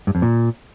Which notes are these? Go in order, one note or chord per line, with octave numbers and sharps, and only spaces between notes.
G2
F2
A#2